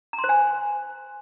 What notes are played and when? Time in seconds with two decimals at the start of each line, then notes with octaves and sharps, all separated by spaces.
0.13 A#5
0.18 C6
0.24 C5
0.29 G#5